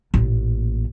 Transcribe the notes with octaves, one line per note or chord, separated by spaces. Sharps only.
A1 A#2